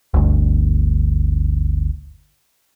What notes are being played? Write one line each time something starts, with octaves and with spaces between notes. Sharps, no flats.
G1 D2